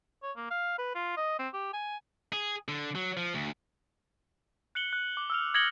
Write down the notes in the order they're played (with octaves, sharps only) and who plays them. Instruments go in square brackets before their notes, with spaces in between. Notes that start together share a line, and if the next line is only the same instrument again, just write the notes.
[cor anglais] C#5
A#3
F5
B4
F4
D#5
C4
G4
G#5
[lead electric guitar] G#4
D3
F#3
F3
D2
[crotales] F#6 C#7 F#7 G7
F#6
D6
E6 F6 F7
D#6 G#6 A#6 C#7 F#7 G7